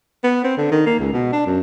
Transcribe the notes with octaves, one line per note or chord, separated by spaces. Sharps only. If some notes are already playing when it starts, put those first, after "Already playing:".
B3
C4
D3
D#3
A#3
C#2
B2
D4
F#2